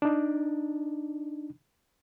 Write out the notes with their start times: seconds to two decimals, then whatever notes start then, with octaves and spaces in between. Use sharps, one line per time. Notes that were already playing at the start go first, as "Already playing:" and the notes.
0.02 D4 D#4